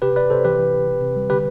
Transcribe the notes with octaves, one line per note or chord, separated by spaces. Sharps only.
C3 G4 B4
C3 B4 D5
C3 A4 C5
E3 G4 B4
E3
E3
C3
C3
G3
D3 G4 B4